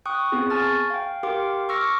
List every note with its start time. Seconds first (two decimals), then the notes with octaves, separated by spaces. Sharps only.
0.06 G5 C#6 D#6 F#6
0.32 B3 C4 F4 G#4
0.50 G#5 A5 C#6 F6 A6
0.90 F5 G5
1.23 G4 A#4 F5 G5 C6 D6
1.69 C#6 D6 E6 F6 A#6 C#7